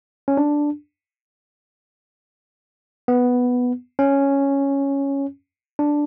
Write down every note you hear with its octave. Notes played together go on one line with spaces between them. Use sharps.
C#4
D4
B3
C#4
D4